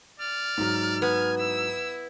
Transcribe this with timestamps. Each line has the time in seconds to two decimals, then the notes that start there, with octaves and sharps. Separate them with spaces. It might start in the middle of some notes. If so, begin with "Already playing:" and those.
0.20 D5 F6
0.57 G#2 F#3
1.02 B3 G#5
1.38 E4 E6